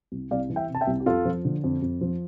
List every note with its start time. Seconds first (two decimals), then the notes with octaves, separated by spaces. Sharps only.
0.12 C2
0.31 C2 D5 F5
0.50 E3
0.56 E5 G5
0.69 C3
0.75 A5
0.81 E5 G5
0.87 C2
1.00 G4
1.06 F2 F4 A4
1.25 F3
1.45 D3
1.64 F2
1.82 F2
2.01 F3